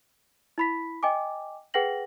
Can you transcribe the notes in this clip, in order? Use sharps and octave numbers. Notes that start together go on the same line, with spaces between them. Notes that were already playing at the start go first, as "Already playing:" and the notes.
E4 B5 B6
D#5 G5 G#5 D6
G#4 B4 F#5 G5 A#6 F#7